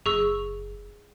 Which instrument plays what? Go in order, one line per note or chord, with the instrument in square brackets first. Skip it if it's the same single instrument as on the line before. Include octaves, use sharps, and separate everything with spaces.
[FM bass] F#1 [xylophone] G#4 C#6 E6